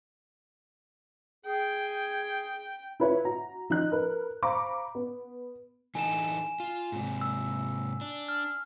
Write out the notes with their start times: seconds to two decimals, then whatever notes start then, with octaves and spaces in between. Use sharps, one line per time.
1.46 G#4 G5
3.00 E4 F4 B4 C#5 E5
3.25 F#4 A#5
3.70 F3 D#4 D#5 F#6
3.92 A#4 B4
4.43 C5 F5 A#5 B5 C#6 D6
4.95 B3
5.95 E3 D#4 A4 G#5 E7
6.60 F4
6.92 G#2 C3
7.21 E6
8.01 D4
8.29 F6